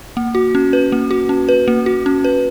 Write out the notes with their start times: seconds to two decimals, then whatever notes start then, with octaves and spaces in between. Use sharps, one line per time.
0.17 A#3
0.35 F#4
0.55 C#4
0.73 B4
0.92 A#3
1.11 F#4
1.29 C#4
1.49 B4
1.68 A#3
1.86 F#4
2.06 C#4
2.24 B4